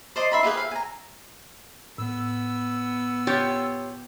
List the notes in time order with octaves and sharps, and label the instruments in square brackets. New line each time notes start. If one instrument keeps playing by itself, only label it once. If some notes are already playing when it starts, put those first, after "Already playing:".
[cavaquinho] C5 D5 D#5 C6
D#4 E5 B5 C6
F4 G4 G#4 B4
E5 F5
G#5 A#5
[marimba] A2 [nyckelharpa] B3 [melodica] E6
[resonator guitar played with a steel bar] F4 G4 C#5